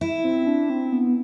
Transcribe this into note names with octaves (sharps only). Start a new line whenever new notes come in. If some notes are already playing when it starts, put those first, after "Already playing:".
E4
C4
D4
C4
B3